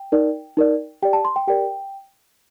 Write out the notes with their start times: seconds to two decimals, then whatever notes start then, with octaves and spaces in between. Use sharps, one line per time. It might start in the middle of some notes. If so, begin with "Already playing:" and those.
Already playing: G5
0.12 D#4 A#4 D5
0.57 D#4 A#4 D5
1.02 G4 D5 G5
1.13 A5
1.25 C6
1.36 G5
1.48 G4 A#4 D5 G5